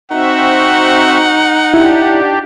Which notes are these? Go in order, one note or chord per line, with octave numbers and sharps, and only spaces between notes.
C4 D#4 F#4 E5 F#5
D4 E4 G4